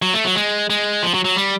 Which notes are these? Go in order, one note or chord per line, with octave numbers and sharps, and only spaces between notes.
F#3
A3
F#3
G#3
G#3
F3
F#3
F#3
G3